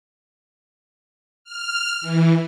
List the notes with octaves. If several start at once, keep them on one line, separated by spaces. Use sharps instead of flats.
F6
E3